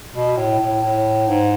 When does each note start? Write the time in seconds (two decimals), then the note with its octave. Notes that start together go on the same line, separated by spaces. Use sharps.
0.15 B2
0.37 A2
0.60 A2
0.82 A2
1.28 G#2